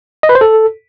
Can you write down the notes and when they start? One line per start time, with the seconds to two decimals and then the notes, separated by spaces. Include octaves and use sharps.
0.23 D#5
0.29 B4
0.35 C5
0.41 A4